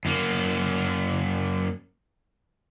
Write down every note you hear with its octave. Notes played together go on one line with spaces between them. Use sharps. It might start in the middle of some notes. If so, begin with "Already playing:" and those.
F#2 A#3